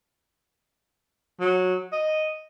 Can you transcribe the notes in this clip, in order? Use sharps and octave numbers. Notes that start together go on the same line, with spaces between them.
F#3
D#5